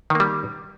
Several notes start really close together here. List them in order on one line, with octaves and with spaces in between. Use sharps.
D#3 A#3 G3